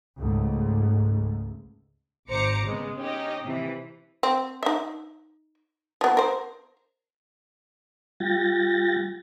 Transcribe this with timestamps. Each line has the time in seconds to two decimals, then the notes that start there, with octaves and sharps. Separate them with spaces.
0.19 C#2 G#2 A3
2.29 G#1 C5 A#5 D6 C#7
2.64 C#3 G#3 B3
2.99 C#4 D#4 G4 D#5
3.44 C3 E3
4.23 C4
4.63 D#4 E5
6.01 F3 B3
6.17 A#4 C5
8.20 G3 F4 G5 A6 A#6